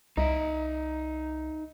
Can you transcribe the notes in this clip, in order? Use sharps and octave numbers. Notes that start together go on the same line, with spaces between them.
C2 D#4 D#5 E5 A#5